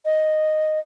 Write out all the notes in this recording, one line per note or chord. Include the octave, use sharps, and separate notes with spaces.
D#5